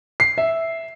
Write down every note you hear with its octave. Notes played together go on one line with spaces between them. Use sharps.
C7
E5